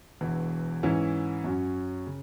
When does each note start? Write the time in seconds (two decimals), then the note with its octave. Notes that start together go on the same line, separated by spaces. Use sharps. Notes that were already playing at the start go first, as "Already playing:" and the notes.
0.21 E1 E2 E3
0.83 G#2 E3 C#4 E4
1.44 F#2 F#3 C#4
2.07 C#3